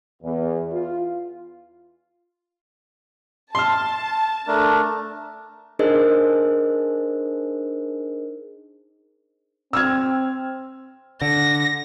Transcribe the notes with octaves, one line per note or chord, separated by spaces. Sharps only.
E2
F4
A5 C6 F6
A3 D4 A#4
D4 D#4 G#4 A#4 C5 D#5
C4 E6 F6 G#6
D3 A#6